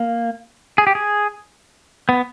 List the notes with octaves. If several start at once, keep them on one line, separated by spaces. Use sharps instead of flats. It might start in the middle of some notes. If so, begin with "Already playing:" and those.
Already playing: A#3
G#4
G4
G#4
B3